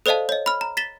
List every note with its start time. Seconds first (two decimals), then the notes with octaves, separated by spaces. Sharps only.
0.06 A4 C5 D5 D#5 F5 A5
0.29 C#5 D#5
0.46 B5 F6
0.61 A#5
0.77 A6 B6 E7 G7